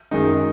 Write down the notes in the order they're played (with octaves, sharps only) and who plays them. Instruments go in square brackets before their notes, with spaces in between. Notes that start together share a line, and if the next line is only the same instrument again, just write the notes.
[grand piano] F#2 D#3 G#3 D#4